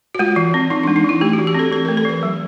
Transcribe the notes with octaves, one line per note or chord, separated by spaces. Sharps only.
F#4
G#3 F4
E3
C4
E3 D#4
G#3 D4
D#4
E3 E4
A3 G4
F#4
E3
G4
C4 A4
E3 A4
A3 A#4
A4
E3 B4
F#3